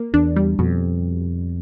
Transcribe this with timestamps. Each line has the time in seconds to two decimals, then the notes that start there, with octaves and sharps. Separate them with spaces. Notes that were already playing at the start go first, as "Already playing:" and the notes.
Already playing: A#3
0.13 E2 D4
0.36 G3
0.59 F2 B2